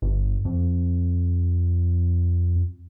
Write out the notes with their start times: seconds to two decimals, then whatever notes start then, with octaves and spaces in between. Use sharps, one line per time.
0.02 G1
0.45 F2